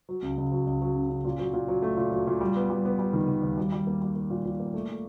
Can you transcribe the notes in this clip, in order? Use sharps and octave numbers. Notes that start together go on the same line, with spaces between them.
F#3
C#2
C#2
F#3
C#2
F#3
C#3
C#3
A#2
F#3
A#2
F#3
A3
A#2
F#3
A#2
G3
B3
G3
B3
G3
D#3
D#3
D#2
G3
G3
A#3
G3
A#3
A#2
A#2
A#3
A3
A3